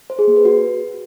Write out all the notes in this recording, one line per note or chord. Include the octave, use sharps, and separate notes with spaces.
C5
G#4
A#3
B4
F#4